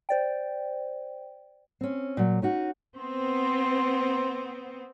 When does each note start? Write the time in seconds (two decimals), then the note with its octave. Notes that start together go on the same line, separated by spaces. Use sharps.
0.09 C5 D5 G5
1.81 C4 C#4
2.17 A#2 F#3
2.42 C#4 D#4 F#4
2.97 B3 C4 C6